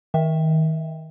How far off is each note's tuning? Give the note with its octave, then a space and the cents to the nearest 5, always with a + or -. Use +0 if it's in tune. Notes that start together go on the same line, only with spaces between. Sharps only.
D#3 +25 E5 +0